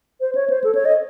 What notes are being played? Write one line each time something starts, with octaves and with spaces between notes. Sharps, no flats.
C5
C#5
C5
A4
C#5
D#5